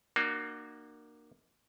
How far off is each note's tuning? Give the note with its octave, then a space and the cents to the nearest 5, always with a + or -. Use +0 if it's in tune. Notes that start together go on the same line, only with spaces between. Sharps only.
A#3 +0 D4 +40 F#4 +0